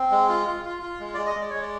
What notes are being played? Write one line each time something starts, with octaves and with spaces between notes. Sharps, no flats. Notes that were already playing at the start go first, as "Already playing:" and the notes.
Already playing: C4
G#3
F4
F4
F4
F4
G#3
G#3 D5
D#5
G#3
D5
G#3 C#5
D5